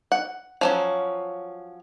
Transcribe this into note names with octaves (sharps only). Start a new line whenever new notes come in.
F#5
F3 F#3 C#4